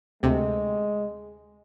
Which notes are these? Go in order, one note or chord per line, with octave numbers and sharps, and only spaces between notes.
D2 C3 G#3